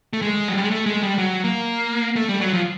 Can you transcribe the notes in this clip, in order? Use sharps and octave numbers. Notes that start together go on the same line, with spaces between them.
A3
G#3
F#3
G3
G#3
A3
G#3
G3
F#3
A#3
A3
G3
F#3
F3